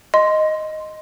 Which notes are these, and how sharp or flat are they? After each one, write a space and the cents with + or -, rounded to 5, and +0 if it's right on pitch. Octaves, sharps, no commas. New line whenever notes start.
D#5 +0 C6 +0